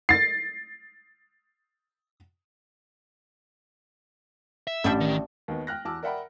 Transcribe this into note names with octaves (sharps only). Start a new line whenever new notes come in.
A6 C7
E5
A1 G3 D4 E4
D#3
D#2 D#3 B3
G5 F6 F#6 A#6
E2 A5 D6 E6 F6
A#4 D5 E5 F#5 G5 B5